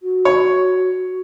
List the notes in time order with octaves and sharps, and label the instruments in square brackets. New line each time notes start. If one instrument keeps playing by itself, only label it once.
[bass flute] F#4
[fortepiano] C#5